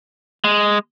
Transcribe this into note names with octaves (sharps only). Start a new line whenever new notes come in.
G#3